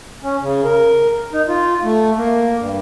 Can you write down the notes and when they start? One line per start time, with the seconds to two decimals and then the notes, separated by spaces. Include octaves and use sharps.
0.23 C#4
0.42 C#3
0.65 A#4
1.33 D#4
1.48 F4
1.83 A3
2.17 A#3
2.57 G2